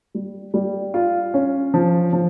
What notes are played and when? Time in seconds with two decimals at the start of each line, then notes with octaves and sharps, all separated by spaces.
0.14 G3
0.54 G3
0.94 F4
1.34 C#4
1.74 F3
2.13 F3